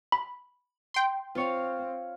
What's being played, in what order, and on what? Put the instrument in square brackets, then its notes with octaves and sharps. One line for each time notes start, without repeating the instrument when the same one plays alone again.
[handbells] B5
[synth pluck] G5 C6
[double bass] C4 [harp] F4 C#5 F5